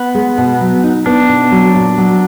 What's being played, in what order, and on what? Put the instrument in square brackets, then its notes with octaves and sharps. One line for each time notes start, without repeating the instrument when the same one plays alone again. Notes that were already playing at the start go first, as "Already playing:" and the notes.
Already playing: [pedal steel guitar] B3
[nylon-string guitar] G#3
B2
F#3
D#4
[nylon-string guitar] B3 [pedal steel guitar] D4
[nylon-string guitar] B2
F#3
A#2
F#3